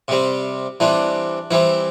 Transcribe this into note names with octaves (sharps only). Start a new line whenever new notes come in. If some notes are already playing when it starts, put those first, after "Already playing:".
C3 G3 C4
E3 G3 C4 D4
E3 G3 C4 E4